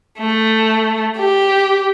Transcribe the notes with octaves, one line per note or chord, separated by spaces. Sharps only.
A3
G4